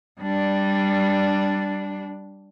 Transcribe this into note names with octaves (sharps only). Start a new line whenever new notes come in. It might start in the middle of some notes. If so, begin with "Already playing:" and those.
G3 D4